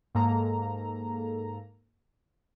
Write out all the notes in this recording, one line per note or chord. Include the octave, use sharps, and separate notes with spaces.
G#2 A#3 A4 A#5